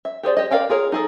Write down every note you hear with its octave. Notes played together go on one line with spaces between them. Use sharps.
E5
G4 G#4 C5 D5
G4 D#5
A#4 D5 F5 G5 G#5
F4 G#4 A#4 C#5
D#4 G#4 A4